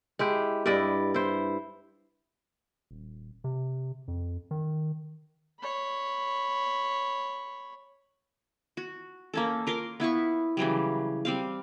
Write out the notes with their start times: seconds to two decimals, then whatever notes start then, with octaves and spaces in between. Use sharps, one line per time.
0.19 G#3 E4 G4
0.66 G2 E4 D5 D#5
1.14 E4 C5
2.91 D#1
3.44 C3
4.08 F2
4.51 D#3
5.59 C#5 B5
8.77 F#4
9.34 A#3 C#4 A4
9.67 F4 A#4 C6 D6
10.00 B3 E4 F5 C#6
10.57 C#3 E3 F#3 G3
11.25 G3 C4 F5